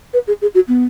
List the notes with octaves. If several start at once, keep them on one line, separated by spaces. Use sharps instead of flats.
B4
G#4
G#4
F#4
B3